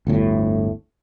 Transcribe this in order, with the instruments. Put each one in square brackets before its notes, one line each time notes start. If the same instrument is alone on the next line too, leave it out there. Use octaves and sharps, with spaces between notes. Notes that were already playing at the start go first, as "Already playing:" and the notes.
[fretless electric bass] G1 D2 A2